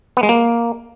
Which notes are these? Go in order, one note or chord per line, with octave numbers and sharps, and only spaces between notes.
B3
G#3
A#3